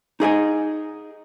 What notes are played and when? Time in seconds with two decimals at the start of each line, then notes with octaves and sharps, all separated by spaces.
0.20 D#4 G#4 D#5 G#5